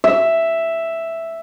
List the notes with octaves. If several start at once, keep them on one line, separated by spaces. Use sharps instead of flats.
E5